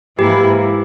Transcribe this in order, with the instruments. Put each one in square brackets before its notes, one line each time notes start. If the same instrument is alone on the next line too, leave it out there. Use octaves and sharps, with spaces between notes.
[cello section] G#2 E3 A#3 E4 [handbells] G4